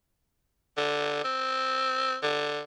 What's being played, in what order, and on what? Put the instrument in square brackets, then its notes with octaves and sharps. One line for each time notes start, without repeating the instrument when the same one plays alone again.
[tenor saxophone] D3
C4
D3